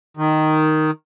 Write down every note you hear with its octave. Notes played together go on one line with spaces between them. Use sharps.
D#3